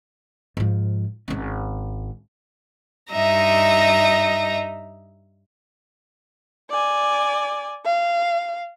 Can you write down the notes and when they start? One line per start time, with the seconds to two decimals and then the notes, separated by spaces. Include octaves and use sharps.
0.57 G#2 F3
1.28 G#1 C#4
3.12 G2 D#4 D#5 E5 A#5
6.71 D5 G#5
7.85 F5